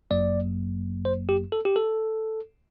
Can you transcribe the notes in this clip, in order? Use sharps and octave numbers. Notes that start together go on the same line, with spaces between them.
G1 F#2 F#3 A#3 D5
C5
G4
A4
G4
A4